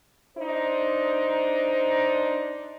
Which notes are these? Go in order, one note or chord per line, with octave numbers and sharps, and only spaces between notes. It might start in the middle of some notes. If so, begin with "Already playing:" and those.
D4 D#4 C5